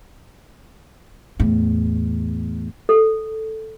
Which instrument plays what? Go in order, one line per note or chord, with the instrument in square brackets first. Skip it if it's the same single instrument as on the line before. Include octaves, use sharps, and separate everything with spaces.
[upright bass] E2 A2
[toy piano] A4